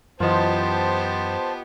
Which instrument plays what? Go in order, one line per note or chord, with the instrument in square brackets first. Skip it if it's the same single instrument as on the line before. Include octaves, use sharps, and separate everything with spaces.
[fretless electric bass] F#2 E3 [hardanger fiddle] B3 G4 [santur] F4 D#5 [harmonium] C5 A5